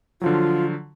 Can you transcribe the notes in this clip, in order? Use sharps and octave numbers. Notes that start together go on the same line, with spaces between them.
D3 F3 F#3 F4